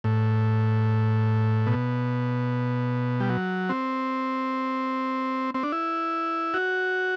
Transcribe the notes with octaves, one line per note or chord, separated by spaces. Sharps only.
A2
B2
G3
F#3
C4
C4
D4
E4
F#4